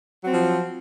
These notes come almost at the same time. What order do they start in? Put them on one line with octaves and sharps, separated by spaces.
F#3 C4 F3